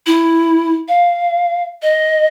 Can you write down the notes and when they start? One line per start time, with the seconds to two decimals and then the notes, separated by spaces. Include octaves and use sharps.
0.06 E4
0.88 F5
1.83 D#5